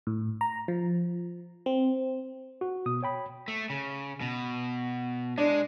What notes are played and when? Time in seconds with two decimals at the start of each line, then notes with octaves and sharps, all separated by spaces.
0.07 A2
0.41 A#5
0.68 F3
1.66 C4
2.61 F#4
2.86 B2 D#6
3.03 C#5 G5 B5
3.48 A3
3.70 C#3
4.21 B2
5.38 G#3 D4